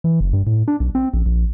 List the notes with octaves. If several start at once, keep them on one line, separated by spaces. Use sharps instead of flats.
E3
F#1
G2
A2
D4
B1
C4
A#1
A#1